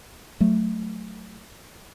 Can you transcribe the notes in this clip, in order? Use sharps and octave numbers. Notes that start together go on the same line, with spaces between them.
F#3 A3